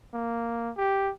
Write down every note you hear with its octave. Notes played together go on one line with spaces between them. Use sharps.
A#3
G4